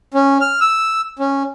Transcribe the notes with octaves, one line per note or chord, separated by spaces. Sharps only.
C#4
F6
E6
C#4